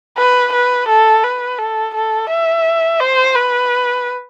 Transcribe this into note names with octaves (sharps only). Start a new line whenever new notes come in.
B4
B4
A4
B4
A4
A4
E5
C5
B4